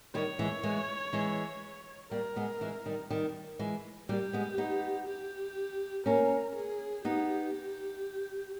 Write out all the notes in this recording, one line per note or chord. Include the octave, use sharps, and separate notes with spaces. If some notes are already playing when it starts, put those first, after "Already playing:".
D#3 G3 C#5
E3 G#3
E3 G#3
E3 G#3
G3 A#3 A#4
G#3 B3
E3 G#3
D#3 G3
D#3 G3
E3 G#3
G3 A#3 G4
G#3 B3
B3 D#4
G4
A#3 C#4 A#4
G#4
B3 D#4 G4